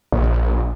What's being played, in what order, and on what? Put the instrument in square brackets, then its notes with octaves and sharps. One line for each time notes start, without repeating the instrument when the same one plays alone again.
[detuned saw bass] A#1